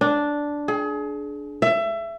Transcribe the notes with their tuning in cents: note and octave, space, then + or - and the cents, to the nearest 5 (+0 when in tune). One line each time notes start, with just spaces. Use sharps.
D4 -5
G#4 +30
E5 +25